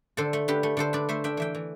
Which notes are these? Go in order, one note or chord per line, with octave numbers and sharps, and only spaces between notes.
D3 A4 C5
A3
D3 G4 B4
A3
D3 A4 C5
D4 B4 D5
A3 C5 E5
D4 E5 G5
E3 E5 G5
E3